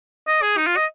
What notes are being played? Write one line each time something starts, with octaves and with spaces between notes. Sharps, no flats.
D#5
G#4
D#4
F4
D#5